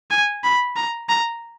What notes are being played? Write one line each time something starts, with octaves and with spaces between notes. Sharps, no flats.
G#5
B5
A#5
A#5